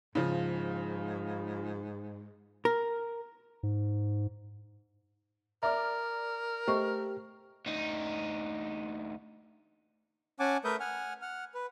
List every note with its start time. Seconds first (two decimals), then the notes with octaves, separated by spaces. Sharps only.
0.15 G#2 C#3 F3
2.65 A#4
3.63 G#2
5.63 A#4 D5 E5 A#5 D6 F6
6.68 A3 G4 C5 D#5 C#6
7.66 D2 D#4
10.40 C#4 F#5 G#5 A5 D6
10.64 A3 A#4 B4 E5 D#6 G6
10.80 F#5 G#5 F6
11.22 F#5 F6
11.54 B4